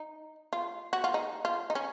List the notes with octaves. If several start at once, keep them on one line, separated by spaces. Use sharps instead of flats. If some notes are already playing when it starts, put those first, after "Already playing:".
Already playing: D#4
F4
F#4
F4
D#4
F4
D#4
C#4